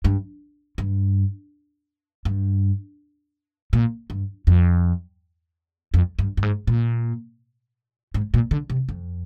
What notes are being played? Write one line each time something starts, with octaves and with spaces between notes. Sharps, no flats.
G2
G2
G2
A#2
G2
F2
F2
G2
G2
G#2
A#2
G#2
A#2
D3
C3
F2